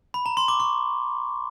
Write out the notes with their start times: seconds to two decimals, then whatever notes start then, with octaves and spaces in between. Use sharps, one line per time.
0.14 B5
0.26 A#5
0.37 C6
0.48 D6
0.60 C#6